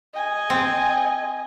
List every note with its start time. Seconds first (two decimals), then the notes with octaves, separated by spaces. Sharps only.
0.14 D#5 G#5
0.50 C4